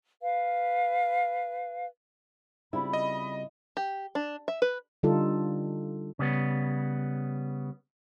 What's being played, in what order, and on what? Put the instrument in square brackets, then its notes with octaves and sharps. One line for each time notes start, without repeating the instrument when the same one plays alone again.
[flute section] B4 F5
[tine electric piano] C#3 G3 C4 [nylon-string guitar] E4 F4 [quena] B5
[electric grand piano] D#5
[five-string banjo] G4
D4
E5
B4
[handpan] D3 G3 D#4 F4 A4
[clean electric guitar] C#3 G3 B3